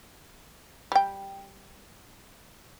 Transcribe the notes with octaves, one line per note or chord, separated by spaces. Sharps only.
G3 G5